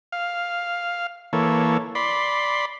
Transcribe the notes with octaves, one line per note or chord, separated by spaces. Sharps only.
F5
E3 A#3 A4 C#5
D5 B5 C6